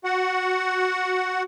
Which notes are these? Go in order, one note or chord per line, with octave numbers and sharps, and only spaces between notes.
F#4 F#5